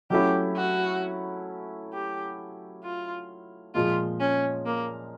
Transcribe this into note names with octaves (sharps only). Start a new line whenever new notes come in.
F#3 A3 C#4 E4 G4
F#4
G4
F4
A#2 F3 G#3 F4
C#4
A#3